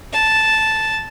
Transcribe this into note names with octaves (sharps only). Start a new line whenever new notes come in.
A5